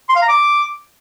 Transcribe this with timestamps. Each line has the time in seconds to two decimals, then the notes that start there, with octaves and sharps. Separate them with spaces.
0.09 C6
0.15 F5
0.22 A#5
0.28 D6